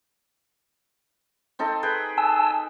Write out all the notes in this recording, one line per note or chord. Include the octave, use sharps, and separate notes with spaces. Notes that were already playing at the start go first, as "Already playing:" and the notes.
C4 D#4 A4
G#4 B4 G5
G#5 A5 E6